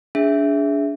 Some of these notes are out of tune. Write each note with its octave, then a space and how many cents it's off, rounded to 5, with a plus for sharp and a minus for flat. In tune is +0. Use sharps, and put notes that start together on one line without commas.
D4 -25 G#4 +0 E5 +0